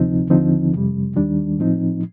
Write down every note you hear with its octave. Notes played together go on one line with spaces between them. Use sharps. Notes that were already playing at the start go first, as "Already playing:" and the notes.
Already playing: D2 C3 F3 C4 D#4
D#2 D3 F3 C4 D#4
F2 C3 G3
D#2 D#3 G3 D4
A2 F3 C4 D#4